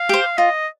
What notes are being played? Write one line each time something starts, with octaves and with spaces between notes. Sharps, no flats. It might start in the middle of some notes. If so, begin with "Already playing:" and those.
Already playing: F5
G4 C5
F4 D#5